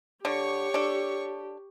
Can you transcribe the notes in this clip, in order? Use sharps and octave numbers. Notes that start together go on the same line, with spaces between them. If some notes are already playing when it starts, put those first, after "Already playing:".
D3 G4 C#5 C#6
D4 A4